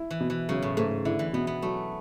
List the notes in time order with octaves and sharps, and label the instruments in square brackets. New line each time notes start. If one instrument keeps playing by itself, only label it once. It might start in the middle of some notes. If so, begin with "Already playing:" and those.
Already playing: [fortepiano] E4
[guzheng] E3
[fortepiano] B2
[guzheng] E3
[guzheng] C#3 [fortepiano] F#3
[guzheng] A2
[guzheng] G#2 [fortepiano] A3
[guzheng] D3 [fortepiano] E4
[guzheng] E3
[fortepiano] B2 [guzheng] B3
[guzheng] B3
[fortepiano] F#3 [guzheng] A3